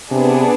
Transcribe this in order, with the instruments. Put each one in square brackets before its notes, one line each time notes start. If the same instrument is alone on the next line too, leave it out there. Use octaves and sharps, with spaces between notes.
[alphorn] C3 [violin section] B3 D4 G#4